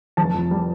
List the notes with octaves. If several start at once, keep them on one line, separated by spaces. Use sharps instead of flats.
F1 A5
F2
G3